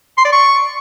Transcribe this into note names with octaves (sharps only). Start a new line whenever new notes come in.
C6
D5
C#6